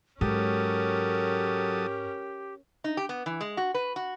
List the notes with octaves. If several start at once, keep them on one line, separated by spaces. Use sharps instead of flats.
G#2 F#3 C#4 G4 A4 A#4 D#6
D#4
G4
B3
E3
G#3
F#4
B4
F#4